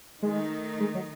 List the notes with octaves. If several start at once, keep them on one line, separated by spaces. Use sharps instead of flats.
D#3 G#3 A3 D#4
G#3
F#3